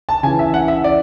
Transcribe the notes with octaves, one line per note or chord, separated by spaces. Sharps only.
A5
C#3 E3 G#5
E5
F#5
E5
D5